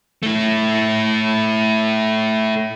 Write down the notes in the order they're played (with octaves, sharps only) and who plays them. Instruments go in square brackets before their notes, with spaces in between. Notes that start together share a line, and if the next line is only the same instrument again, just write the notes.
[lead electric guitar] A3 E4